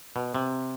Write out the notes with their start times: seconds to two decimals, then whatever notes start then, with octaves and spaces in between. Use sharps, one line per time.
0.16 B2
0.35 C3